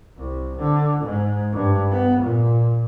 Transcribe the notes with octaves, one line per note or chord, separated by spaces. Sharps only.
C2
D3
G#2
G2
B3
A#2